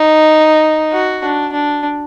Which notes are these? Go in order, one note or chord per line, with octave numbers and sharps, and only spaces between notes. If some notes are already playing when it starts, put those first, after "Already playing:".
Already playing: D#4
F#4
D4
D4